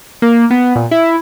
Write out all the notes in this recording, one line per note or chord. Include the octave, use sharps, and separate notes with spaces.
A#3
B3
A#2
E4